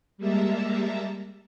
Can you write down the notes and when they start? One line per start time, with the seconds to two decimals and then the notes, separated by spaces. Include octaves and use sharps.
0.18 G3 G#3 A#3 E5 A5 A#5